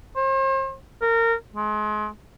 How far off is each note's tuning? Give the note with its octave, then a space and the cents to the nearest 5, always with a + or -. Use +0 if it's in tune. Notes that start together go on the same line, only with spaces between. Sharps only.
C5 +40
A#4 -25
G#3 +35